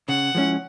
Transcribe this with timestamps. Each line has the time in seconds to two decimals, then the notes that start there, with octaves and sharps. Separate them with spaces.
0.09 C#3 F#5
0.35 F3 G#3 C#4 E4